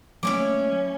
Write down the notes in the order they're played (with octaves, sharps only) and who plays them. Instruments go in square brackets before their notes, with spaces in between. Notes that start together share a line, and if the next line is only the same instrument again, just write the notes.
[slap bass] F#3 A3 A#3 [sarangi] C#4 [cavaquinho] E4 C#5 D6